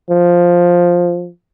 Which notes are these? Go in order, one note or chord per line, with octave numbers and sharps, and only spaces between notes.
F3